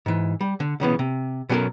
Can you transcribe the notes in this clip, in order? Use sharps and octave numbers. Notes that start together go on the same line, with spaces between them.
G#2 E3
G3
D3
B1 C#3 E3 B3
C3
B2 F#3 C#4 G4 A4 A#4